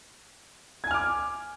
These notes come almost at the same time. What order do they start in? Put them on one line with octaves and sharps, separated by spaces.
G#6 G#5 F6 D6